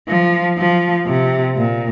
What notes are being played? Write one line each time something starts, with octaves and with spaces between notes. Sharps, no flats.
F3
F3
C3
A#2